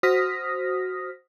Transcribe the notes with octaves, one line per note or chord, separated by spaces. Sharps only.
F#4 C5 D#6 F6 A#6 B6